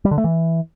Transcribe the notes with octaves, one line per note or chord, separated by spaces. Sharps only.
G3
D3
A3
E3